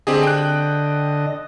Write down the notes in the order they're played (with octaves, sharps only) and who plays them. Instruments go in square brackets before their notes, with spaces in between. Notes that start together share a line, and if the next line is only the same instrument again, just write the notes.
[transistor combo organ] D3 D#5 [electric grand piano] C4 G4 G#4
[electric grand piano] G5 F#6